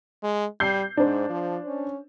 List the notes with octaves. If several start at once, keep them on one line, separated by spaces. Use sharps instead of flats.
G#3
G3 G6 C7
G#2 D4 C5
F3
C#4